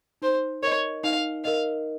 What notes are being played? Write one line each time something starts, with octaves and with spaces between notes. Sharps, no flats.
D#4 C5
A#4 C#5 D#5
D#4 F5
A#4 D#5 F5